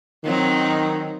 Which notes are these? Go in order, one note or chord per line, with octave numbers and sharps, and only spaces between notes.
D#3 F#3 C4 D#4